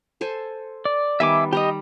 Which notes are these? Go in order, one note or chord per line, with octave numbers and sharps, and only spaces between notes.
A4 C5 G#5
D5
D#3 G3 B3 E5 G#5 D6
G3 G4 D#5 A#5 B5